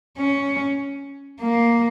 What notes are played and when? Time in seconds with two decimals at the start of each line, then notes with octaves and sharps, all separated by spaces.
0.18 C#4
1.41 A#3